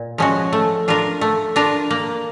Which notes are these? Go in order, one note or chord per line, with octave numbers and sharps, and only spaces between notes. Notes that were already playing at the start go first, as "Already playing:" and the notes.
Already playing: A#2
F3 G#3 C#4 F#4
A3
D4 F4 A#4
A3
D4 F4 A#4
A#3